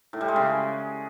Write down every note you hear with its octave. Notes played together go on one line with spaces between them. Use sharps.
A2
G3
G#3
C#3